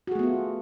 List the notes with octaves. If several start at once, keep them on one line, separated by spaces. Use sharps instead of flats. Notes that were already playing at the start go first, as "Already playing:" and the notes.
A3 B3 F4 F#4 G#4